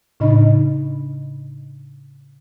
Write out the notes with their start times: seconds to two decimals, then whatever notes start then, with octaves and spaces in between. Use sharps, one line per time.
0.20 A2 C#3 D4 D#4 D#5 B5